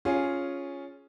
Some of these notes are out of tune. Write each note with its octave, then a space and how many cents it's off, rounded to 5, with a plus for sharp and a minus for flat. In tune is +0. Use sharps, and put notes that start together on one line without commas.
C#4 +0 F4 +0 G#4 +0